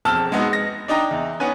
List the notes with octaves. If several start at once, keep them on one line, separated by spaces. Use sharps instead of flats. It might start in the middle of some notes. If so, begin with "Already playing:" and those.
E1 F2 A5 E6 F6
G#3 B3 D#4 F#4
A#6
D4 D#4 D#5 G5 A#5
E2
B3 C#4 D#4 B4 G#5